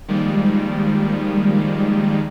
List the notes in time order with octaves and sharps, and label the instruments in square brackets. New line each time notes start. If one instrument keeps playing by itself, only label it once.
[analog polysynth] D#3 F3 G3 G#3 A#3